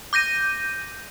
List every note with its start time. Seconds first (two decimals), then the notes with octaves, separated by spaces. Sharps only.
0.13 D6 G6 A#6 D#7